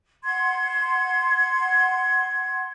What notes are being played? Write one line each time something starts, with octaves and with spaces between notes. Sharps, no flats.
F#5 C6 G#6